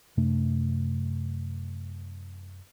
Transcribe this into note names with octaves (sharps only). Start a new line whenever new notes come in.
F#2 C3 A3 D4